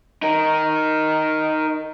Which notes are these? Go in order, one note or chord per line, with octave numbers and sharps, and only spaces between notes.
D#4 A#4